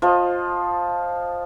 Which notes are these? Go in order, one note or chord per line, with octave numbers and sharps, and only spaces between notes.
F3 D#5